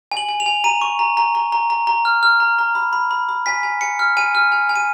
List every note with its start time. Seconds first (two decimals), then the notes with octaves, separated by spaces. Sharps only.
0.12 G#5
0.17 F#7
0.29 G#5
0.40 F7
0.46 G#5
0.64 A#5 D#7
0.81 C#6
0.99 A#5
1.17 A#5
1.35 A#5
1.52 A#5
1.70 A#5
1.87 A#5
2.05 F6
2.23 F6
2.40 A#5
2.59 A#5
2.75 B5
2.93 B5
3.11 B5
3.29 B5
3.46 G#5 B6
3.63 G#5
3.81 G#5 C#7
3.99 F6
4.17 G#5 D#7
4.35 F6
4.52 G#5
4.69 G#5
4.76 D#7